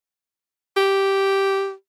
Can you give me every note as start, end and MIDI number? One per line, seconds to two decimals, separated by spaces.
0.77 1.72 67